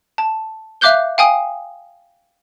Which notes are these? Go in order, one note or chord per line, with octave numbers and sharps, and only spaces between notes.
A5
E5 F5 D6 F#6 G6 G7
F5 G5 G#5 D#6